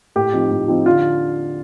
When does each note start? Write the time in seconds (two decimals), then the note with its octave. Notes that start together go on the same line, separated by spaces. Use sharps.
0.16 A2 G4
0.33 F3 C4 D#4
0.51 A2
0.68 F3 C4 D#4
0.86 D3 F4